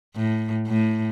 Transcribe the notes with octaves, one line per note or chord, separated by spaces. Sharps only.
A2
A2